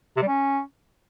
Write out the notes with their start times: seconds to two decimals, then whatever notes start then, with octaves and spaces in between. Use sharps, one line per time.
0.17 C3
0.22 G3
0.28 C#4